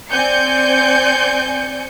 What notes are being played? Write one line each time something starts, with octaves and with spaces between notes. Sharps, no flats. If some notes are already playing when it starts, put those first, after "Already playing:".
C4 D5 G#5 G6 C#7